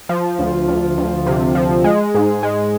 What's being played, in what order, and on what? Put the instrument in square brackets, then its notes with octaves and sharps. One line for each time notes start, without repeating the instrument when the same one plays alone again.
[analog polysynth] F3
D2
D2
D2
C3
F3
G#3
G#2
G#3